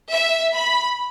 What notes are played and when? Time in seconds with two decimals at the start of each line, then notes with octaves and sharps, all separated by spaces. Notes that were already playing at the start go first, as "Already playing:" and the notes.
0.11 E5
0.54 B5